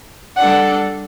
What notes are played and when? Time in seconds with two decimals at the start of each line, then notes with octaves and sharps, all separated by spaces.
0.37 G3 D4 A4 D5 F#5